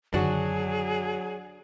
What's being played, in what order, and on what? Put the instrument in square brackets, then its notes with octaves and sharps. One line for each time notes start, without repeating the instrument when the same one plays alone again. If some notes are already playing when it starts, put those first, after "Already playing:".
[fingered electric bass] F#2 D3 D#3 [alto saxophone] F#3 [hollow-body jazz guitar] D4 F#4 [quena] G#4